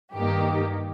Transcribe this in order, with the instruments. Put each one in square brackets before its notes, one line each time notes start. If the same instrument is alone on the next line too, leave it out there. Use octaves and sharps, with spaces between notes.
[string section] G2 D#3 A#3 D#4 G4